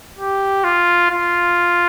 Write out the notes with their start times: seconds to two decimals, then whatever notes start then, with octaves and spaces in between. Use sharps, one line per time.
0.18 G4
0.64 F4
1.10 F4